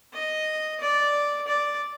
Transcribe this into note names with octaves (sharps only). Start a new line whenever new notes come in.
D#5
D5
D5